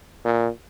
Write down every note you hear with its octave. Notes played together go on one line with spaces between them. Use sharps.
A#2